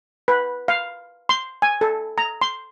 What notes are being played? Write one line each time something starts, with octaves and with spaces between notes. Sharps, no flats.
B4
F5
C6
G#5
A4
A#5
C6